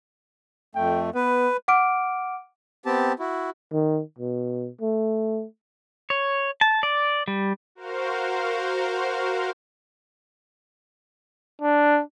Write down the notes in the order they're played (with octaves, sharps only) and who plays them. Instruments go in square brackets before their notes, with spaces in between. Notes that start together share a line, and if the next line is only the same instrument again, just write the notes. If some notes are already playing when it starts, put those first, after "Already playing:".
[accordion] F2 A3 [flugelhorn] G5
[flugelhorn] B3 [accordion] B4
[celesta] F#5 D6 F6 D7
[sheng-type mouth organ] B3 C4 G4 A5
E4 F#4
[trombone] D#3
B2
A3
[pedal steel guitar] C#5
A5
D5
G3
[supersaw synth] F#4 A#4 C5 F5
[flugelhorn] D4